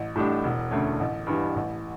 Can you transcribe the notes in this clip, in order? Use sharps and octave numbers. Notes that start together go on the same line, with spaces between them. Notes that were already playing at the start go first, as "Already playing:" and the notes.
Already playing: A1
A2 G3 D4
E1
D2 D3 A3 C#4
A1
G2 E3 G3
A1